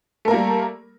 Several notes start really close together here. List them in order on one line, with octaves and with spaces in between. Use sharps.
A3 A#4 A#3 G3